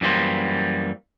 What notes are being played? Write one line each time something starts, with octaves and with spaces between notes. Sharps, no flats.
F#2 E3 G3 A#3 C5